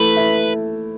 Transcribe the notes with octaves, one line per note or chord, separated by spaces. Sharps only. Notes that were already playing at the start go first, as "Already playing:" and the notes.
Already playing: E3 A3 B4
E4